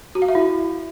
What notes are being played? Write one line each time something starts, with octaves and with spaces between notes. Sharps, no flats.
F#4
F5
E5
E4